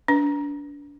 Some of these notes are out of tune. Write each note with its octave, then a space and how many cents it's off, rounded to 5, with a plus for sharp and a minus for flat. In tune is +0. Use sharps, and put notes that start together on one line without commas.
D4 -30 B4 +0